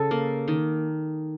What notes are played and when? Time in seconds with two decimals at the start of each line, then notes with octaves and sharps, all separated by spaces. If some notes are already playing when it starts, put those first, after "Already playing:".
Already playing: C#3 A4
0.11 A#3
0.48 D#3